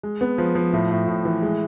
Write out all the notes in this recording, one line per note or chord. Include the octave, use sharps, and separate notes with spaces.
G#3
B3
F3
F3
A2
A2
A2
E3
G#3